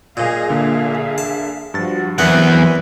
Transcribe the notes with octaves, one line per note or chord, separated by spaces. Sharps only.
A#2 G#4 D#5 F5
D3 A#3 G#4 E5 F5
A5
G2 F3 F#4 A6
E2 E3 F#3 B3 C4 A#4 B4 F#5